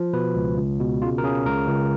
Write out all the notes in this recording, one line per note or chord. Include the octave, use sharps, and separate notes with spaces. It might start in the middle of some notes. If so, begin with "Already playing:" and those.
Already playing: F3
B2 B4
C#2
C#2
B2
C#3 F4
A#4
C#3 G#4
C#2 A#4
C#2